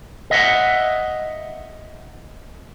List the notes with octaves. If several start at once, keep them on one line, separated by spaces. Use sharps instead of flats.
D#5 E5 F#5